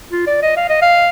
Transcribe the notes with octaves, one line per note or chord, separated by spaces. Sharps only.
F4
D5
D#5
F5
D#5
F5